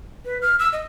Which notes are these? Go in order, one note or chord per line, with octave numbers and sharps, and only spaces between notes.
B4
F6
E6
D#5